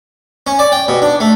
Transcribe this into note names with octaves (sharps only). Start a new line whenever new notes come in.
C#4
D5
G5
B2
D4
A3